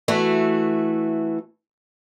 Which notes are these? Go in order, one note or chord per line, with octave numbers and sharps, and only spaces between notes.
E3 A3 F#4